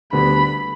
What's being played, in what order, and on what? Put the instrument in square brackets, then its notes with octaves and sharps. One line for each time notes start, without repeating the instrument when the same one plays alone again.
[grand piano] D2 D3 G3 B3 D4 [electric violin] B5